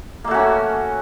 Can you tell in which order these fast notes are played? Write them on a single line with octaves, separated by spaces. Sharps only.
A#3 A3 F#4 C#4